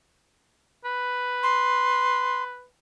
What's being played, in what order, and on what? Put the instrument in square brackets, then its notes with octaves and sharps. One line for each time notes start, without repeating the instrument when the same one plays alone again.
[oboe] B4
[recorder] C6